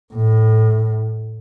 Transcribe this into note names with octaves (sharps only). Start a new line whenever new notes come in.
A2